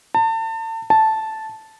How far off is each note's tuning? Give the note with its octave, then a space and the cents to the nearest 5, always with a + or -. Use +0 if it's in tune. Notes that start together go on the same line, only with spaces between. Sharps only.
A5 +35
A5 -5